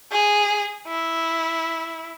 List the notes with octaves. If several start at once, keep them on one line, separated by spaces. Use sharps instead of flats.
G#4
E4